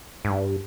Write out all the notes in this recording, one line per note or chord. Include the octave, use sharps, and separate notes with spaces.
G#2
G2